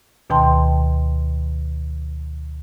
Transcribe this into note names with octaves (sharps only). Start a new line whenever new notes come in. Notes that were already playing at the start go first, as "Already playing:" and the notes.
D2 B2 D#3 G5 A5 C6